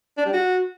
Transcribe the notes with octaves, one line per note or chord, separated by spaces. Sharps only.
D4
G3
F#4